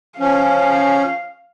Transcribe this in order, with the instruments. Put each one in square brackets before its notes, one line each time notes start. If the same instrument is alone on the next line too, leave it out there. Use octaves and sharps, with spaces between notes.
[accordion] F3 C#4 [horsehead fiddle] F5